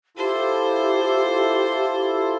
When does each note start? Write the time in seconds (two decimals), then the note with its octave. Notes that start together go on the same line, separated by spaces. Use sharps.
0.17 E4 F4 G4 A4 C5